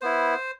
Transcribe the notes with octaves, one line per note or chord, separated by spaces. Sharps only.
B3 E4 C5